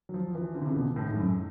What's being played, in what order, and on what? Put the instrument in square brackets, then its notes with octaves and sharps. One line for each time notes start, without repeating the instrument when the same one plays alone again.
[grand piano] F#3
F3
E3
D3
C3
C#3
B2
A2
G#2
F#2